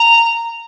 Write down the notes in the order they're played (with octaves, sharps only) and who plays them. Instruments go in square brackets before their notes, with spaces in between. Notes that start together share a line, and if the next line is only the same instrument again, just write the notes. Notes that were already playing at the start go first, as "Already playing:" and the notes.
Already playing: [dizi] A#5